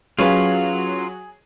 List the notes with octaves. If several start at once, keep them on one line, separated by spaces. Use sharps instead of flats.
F#3 C#4 F4 G#4 B4 F5